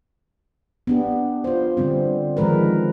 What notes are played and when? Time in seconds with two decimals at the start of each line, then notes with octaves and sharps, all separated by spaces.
0.87 B3 D4 G4
1.44 F4 C5
1.77 D3 G3 C4
2.37 D#3 F3 G#3 A#4 B4